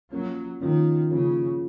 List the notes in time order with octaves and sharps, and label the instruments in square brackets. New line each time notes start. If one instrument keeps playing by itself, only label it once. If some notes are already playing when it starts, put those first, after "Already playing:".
[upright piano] F3 A#3 C#4 F4 [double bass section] F#3
[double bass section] D#3 [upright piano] F3 A#3 C#4 F4
[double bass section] C#3 [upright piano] F3 A#3 C#4 F4